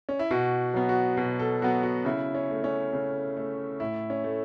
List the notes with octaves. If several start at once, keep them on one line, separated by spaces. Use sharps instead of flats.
C#4
E4
B2 F#4
F#3 B3
F#4
B2
A4
F#3 B3 F#4
F#4
C#3 E4
C#4
A3
C#4
C#3
A3
A2 E4
C#4
A3